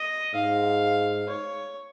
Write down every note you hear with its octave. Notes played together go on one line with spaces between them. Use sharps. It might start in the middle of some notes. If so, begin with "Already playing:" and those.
Already playing: D#5
G#2 F5
C#5